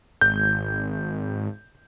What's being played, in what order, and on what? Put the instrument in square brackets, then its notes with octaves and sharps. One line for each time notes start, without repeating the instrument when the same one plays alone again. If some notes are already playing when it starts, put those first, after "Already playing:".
[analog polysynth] G#1 [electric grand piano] G6